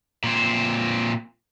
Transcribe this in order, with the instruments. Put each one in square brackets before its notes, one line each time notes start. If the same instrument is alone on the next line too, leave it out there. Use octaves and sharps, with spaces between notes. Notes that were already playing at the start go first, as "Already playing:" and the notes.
[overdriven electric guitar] A#2 C4